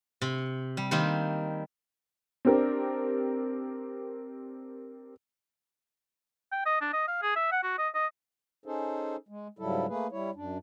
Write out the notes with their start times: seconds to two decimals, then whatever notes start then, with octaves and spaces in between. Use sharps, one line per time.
0.21 C3
0.77 G3
0.91 D#3 G3 A#3 C4
2.45 C4 D4 G4 A#4
6.52 G5
6.66 D#5
6.81 D4
6.93 D#5
7.08 F5
7.22 G#4
7.36 E5
7.52 F#5
7.63 F#4
7.79 D#5
7.94 D#5
8.66 C#4 D#4 G#4 A4 C5
9.29 G#3
9.59 G#2 C#3 F#3 G3 E4 A4
9.88 A3 A#3 G#4 B4
10.12 G3 E4 C#5
10.35 F#2 D4